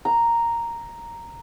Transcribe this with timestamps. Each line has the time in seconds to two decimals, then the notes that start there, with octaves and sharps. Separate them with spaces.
0.05 A#5